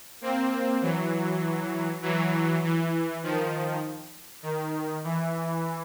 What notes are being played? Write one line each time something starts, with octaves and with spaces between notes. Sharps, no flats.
A#3 C4
E3 F#3
E3 F#3
E3
D#3 F3
D#3
E3